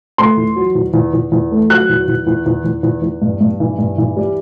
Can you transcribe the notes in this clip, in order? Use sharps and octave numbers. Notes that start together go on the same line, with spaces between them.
A3 C6
E2
F#3
E2
E2
E2
E2
A3
F#3 F#6
E2
E2
E2
E2
E2
E2
E2
G2
G2
E3
G2
E3
G3